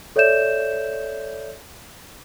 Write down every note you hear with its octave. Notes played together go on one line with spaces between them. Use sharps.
A4 C#5 D5 E5 G6 E7